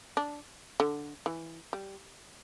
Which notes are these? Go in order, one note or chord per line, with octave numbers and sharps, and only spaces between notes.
D4
D3
E3
G3